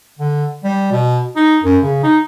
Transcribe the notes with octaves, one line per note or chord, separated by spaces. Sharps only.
D3
G3
B2
D#4
F#2
C#3
D#4